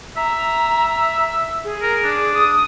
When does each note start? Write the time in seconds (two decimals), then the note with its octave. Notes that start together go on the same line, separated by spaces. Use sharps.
0.17 E5 A#5
1.65 G#4
1.82 A#4
2.04 D4
2.34 D#6